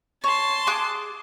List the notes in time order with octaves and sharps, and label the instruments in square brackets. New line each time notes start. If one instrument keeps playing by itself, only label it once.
[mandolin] C#5 [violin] A5 C6
[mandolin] G#4 D6 F#6